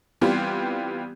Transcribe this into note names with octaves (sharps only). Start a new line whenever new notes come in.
E3 G3 B3 C4 F4 G4